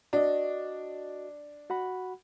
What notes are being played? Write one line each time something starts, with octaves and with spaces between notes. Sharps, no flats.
D4 F#4 D#5
F#4 F#5 B5